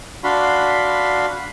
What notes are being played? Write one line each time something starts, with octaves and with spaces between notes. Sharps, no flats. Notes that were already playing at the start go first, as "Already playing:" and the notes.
D4 F#4 F5 B5 C6